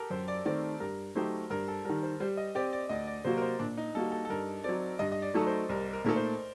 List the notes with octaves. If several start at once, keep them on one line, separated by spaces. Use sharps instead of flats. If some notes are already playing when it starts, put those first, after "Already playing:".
Already playing: G4 A4 A#4
F#2 C5
D5
D#3 A3 C4 D5
G2 A#4
F#3 A3 D#4 G4 C5
G2 A#4
A4
D#3 G3 A#4
C5
G3 C5
D#5
C4 G4 D5
D5
D2 D#5
D5
C3 F#3 A#3 F#4 C5
A#4
C5
A#2 D4
D#4
G3 A#3 F#4 A4
A4
A4
G2 A#4
F#3 C4 D5
G2 D#5
D#5
D5
F#3 A3 D#4 A4
C5
C2 A#4
A#4
A#2 A3 D#4 A4 A#4
C5